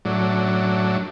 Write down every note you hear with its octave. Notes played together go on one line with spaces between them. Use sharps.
F#2 A2 F#3 D4